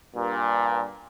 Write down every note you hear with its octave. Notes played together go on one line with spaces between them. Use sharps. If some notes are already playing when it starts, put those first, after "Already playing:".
G2 A#2